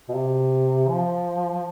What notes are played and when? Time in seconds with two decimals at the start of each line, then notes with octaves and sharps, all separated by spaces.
0.09 B2
0.14 C3
0.88 F3